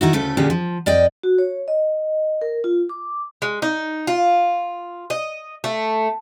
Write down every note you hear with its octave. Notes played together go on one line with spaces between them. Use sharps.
D#3 E4 F#4
D2 C#3 A3 A4
A#2 D3 C#4 G4 G#4 G5
F3
F2 D5 D#5 G5
F#4
C#5
D#5
A#4
F4
D6
G#3
D#4
F4
D#5
A3